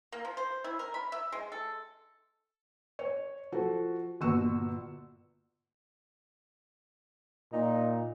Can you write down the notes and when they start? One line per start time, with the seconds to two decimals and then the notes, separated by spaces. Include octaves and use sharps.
0.12 A#3
0.25 F3
0.37 C5
0.64 E4
0.79 A#4
0.94 B5
1.12 E5
1.32 G#3
1.52 A4
2.99 C#5
3.52 F3 F#4 A4
4.21 G1 A#2 F#4 C#6 E6 E7
7.53 A#2 D#4